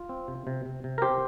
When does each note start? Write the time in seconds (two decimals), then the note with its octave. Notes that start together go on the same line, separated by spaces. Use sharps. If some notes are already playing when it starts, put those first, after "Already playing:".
Already playing: F4
0.09 C4
0.28 C3
0.47 C3
0.65 C3
0.84 C3
0.98 A#4
1.02 C4 G4 C5